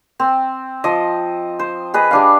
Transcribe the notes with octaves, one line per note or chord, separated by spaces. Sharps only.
C4
F3 D#5
C5
G#4 B4 D#5
G3 D4 F5